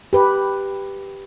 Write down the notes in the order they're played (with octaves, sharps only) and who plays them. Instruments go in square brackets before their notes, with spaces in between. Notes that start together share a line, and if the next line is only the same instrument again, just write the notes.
[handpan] G4 B4